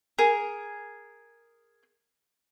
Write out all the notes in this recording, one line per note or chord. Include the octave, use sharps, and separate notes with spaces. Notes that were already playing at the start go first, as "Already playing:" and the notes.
G#4 A#4